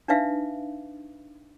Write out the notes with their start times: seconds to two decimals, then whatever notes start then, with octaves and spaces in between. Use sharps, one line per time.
0.08 D4 D#4 B4 E5 F5